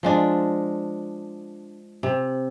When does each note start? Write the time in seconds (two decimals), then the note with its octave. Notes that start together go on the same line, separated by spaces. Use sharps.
0.03 F3 G#3 D4
2.03 C3